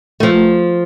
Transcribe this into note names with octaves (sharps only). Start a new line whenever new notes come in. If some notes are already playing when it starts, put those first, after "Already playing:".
F3 A3